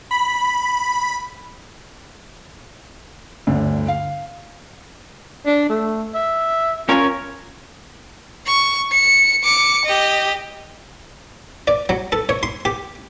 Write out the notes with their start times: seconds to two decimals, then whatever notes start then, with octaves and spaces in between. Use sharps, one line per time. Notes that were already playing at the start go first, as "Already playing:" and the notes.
0.11 B5
3.47 G1 D2 D3
3.88 F5
5.46 D4
5.69 A3
6.15 E5
6.89 C#4 F4 A#4 C#5
8.47 C#6
8.92 C#7
9.44 D6 C#7
9.85 G4 D#5
11.68 D5
11.89 F#3
12.12 A4
12.29 C#5
12.43 C6
12.65 G4